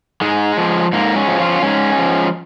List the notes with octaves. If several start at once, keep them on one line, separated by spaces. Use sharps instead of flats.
G#2 G#3
F3
G#2 A#3
G#3 C#4
F3
C#4 F4
G#2 G#3 C#4
F3